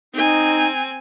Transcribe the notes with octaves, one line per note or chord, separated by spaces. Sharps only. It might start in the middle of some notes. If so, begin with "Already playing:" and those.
C4 D#4 G#5